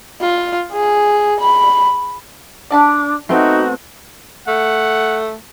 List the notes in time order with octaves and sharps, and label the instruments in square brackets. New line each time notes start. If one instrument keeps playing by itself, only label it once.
[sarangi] F4
G#4
B5
[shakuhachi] D4 [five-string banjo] D5 A5 B5
[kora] A3 B3 C4 [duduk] D#4 [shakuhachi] F#4
[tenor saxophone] A3 [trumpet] F#5